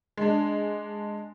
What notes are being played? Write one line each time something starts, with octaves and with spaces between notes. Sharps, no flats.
G#3 D4